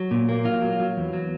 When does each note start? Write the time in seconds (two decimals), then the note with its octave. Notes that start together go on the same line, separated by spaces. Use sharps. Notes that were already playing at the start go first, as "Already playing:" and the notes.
Already playing: F#3
0.11 A#2
0.29 A#3
0.45 F#3 F4
0.62 F#3
0.80 F#3
0.97 E2
1.13 F#3